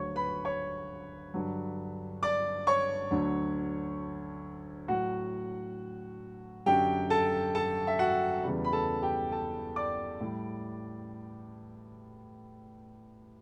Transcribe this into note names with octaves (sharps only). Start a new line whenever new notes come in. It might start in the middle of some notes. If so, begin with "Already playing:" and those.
Already playing: D2 D3 F#3 C#5 C#6
B4 B5
C#5 C#6
G2 D3 F#3
D5 D6
C#5 C#6
D2 D3 F#3
A2 F#3 F#4 F#5
F#2 D3 F#3 G4 G5
A4 A5
A4 A5
E5
F#4 F#5
E2 C#3 E3 G3
B5
A4 A5
G4 G5
A4 A5
D5 D6
A2 G3